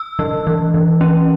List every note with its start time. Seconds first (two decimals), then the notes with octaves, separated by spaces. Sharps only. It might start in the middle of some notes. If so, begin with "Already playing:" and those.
Already playing: E6
0.19 E3
0.47 E3
0.74 E3
1.01 C#4